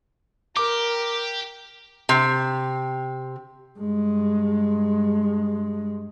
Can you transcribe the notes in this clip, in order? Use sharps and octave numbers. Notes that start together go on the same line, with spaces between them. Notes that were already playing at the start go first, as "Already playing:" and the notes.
G4 A#4 D6
C3
G2 G#3